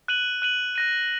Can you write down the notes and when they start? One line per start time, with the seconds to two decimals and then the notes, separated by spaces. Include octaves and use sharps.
0.08 F#6 D#7 F#7
0.42 F#6 D#7 F#7
0.76 F#6 A#6 D#7